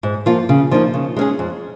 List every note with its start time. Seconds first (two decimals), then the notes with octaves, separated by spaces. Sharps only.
0.03 G#2
0.26 F3 A#3 F4
0.49 C#3
0.71 F3 A#3 D#4
0.94 C#3
1.17 G#3 C#4 G#4
1.39 F2